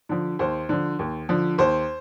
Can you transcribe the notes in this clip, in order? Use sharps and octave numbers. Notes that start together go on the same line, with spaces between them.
D3 F3
D#2 C5
D3 F3
D#2
D3 F3
D#2 C5